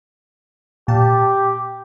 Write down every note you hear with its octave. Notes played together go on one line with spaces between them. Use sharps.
A#2 G4 A5